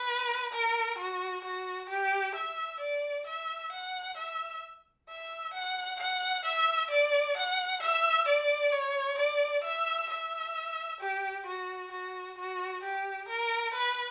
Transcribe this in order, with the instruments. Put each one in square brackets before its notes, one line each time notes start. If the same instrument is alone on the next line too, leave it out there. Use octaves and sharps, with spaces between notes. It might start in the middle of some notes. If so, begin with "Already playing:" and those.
Already playing: [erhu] B4
A#4
F#4
F#4
G4
E5
D5
E5
F#5
E5
E5
F#5
F#5
E5
D5
F#5
E5
D5
C#5
D5
E5
E5
G4
F#4
F#4
F#4
G4
A#4
B4